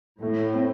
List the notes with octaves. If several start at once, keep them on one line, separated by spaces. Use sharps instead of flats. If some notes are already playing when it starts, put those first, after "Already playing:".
A2 A3
C4